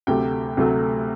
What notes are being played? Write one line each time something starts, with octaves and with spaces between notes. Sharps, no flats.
D2 C3 F#3 A3 G4 G5
D2 C3 F#3 A3